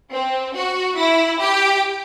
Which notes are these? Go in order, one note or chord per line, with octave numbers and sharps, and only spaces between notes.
C4
F#4
E4
G4